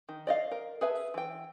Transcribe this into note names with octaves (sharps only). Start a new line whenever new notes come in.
D#3
D5 D#5 F5
A#4
G#4 B4 E5 A5
E3 G5